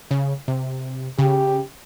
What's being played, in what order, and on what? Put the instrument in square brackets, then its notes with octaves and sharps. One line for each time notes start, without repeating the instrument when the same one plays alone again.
[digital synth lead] C#3
C3
[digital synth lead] C#3 [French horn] G4